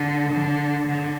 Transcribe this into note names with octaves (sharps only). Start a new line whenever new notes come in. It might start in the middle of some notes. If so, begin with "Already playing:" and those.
Already playing: D3
D3
D3